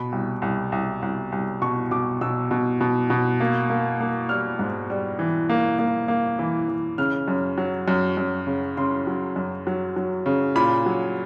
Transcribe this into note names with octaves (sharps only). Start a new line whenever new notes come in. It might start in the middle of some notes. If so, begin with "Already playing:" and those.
Already playing: B2 B5
C2
C2
C2
C2
C2
B2 C#6
B2 D6
B2 E6
B2
B2
B2
A#3
A#3
A#3
G3 F6
G#2
G3
E3
A#3
A#3
A#3
E3
E3
C#3 F6
F#2
F#3
F#2
F#2
C#3
C#3 C6
F#3
F#2
F#3
F#3
C#3
A#2 B5
F#3